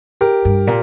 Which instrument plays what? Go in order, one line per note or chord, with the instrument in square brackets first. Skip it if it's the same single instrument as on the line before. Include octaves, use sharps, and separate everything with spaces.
[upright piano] G4 A#4
[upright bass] G2
A#2